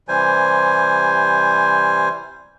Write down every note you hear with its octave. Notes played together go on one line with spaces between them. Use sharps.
C3 E3 G3 C5 G#5